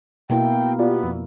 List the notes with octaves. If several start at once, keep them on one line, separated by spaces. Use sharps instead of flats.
B2 A#3 E4 G5
B3 F4 G4 D5
F2